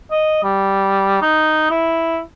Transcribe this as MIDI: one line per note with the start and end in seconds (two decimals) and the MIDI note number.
0.11 0.39 75
0.44 1.20 55
1.22 1.69 63
1.70 2.19 64